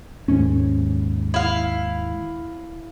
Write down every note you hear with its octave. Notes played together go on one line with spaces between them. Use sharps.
D#2 G#2 C#4
E4 F5